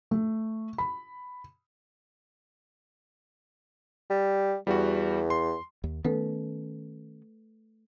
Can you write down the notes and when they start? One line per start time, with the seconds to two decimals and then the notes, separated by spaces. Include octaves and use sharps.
0.11 A3
0.78 B5
4.10 G3
4.67 E2 G3 F#4
5.30 C6
5.84 D#2
6.05 D#3 A3 B3 C#4 A4 B4